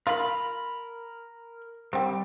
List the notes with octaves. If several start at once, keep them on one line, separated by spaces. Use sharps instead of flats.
F4 A#4 B5
G3 C4 G5